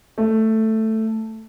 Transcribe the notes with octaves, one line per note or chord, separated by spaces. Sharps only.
A3